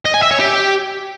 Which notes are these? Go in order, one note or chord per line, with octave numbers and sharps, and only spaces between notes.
D#5
G#5
E5
C#5
G4